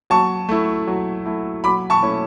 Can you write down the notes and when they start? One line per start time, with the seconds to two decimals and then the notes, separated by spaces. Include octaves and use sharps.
0.10 F#3 A5 C#6
0.49 A3 E4
0.87 F#3
1.26 A3 E4
1.64 F#3 B5 D6
1.90 A5 C#6
2.02 A3 C#4 E4